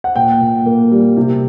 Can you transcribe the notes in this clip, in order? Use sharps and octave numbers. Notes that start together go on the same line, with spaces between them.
F#5
A#2 G5
A#2
A#3
G3
C3